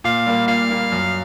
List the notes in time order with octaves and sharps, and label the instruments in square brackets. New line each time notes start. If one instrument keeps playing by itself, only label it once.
[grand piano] A#2 [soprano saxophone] F5
[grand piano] G3 A#3
[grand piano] A#2 [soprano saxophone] F5
[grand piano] G3 A#3
F#2